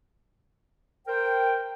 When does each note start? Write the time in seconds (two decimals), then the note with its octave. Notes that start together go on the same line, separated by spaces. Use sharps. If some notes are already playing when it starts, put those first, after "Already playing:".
1.07 A#4 C5 G5